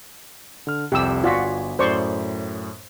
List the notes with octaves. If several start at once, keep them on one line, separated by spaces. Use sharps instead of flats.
D3 F6
C2 F2 G4 E6
G1 F4 F#4 D5 G#5 B6
F#2 A2 C5 D5 C#6